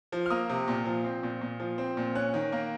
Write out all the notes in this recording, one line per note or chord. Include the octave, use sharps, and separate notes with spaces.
F3
F6
A#3 D#6
C3
A#2
F3
C4
A#2
A#2
F3
C4
A#2
C#4 F#6
D#3
A#3